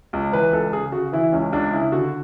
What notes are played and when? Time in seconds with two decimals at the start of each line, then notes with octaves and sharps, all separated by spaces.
0.13 C#2
0.32 E3 B4
0.53 C#2 A4
0.73 C#3 G#4
0.92 C#3 F#4
1.13 E3 E4
1.32 C#2 C#4
1.52 C#2 D4
1.72 C#3 E4
1.92 D3 F#4